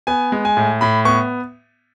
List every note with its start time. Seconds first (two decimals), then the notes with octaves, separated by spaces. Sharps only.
0.07 B3 G#5
0.32 G#3
0.45 G#5
0.57 A2
0.81 A2 B5
1.05 B3 C#6